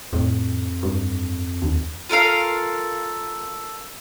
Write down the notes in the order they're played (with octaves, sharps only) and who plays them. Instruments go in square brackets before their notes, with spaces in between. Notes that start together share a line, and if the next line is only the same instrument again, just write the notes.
[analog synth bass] F2 [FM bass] A2
[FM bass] G2
D#2
[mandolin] F4 A4 A#4 F5